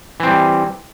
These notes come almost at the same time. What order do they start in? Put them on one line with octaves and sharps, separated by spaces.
E3 C4 G3